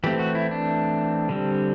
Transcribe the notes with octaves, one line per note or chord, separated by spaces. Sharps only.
E3 A3 C4 G4
F#4
E4
D4
D3 G3 C4